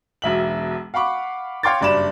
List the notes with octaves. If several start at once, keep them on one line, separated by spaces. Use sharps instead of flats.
E1 B1 E5 F#7
F5 F#5 B5 C#6 D6
C#5 F5 G5 C6 D6 A6
F#1 G2 D5 B5 E7